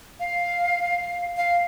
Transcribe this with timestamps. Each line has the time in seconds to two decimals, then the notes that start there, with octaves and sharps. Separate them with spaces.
0.20 F5
1.37 F5